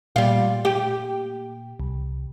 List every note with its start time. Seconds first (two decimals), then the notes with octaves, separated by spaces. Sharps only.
0.16 A#2 G3 F4
0.65 G4
1.80 C2